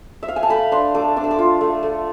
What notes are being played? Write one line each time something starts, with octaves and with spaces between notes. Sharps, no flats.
E5
F5
G#5
A5
A3 B5
D4 C6
A3 D6
D4 D6
E6
D6
F4
A3
A3